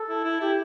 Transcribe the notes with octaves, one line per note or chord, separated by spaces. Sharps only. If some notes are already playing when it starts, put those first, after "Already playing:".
Already playing: A4
E4
E4
E4 G4